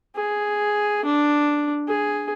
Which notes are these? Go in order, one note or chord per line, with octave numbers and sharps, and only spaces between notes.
G#4
D4
G#4